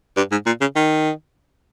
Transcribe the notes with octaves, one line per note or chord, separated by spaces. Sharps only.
G2
G#2
A#2
C#3
D#3